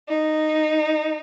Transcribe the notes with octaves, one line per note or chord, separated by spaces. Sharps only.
D#4